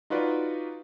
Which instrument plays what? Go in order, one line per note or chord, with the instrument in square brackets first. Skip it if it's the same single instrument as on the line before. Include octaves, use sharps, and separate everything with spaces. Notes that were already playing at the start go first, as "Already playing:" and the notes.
[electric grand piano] D#4 F4 F#4 B4 D5